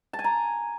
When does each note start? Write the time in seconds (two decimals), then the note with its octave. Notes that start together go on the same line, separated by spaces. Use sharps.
0.13 A5
0.19 G#5
0.24 A#5